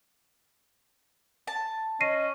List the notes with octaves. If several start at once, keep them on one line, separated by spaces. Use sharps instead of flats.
A5
C#4 D#5 A#6 C7 D#7